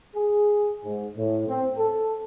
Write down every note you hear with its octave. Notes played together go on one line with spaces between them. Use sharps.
G#4
G#2
A2
C4
A4